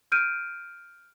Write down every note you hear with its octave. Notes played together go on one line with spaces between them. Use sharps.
F6 G6 D7 D#7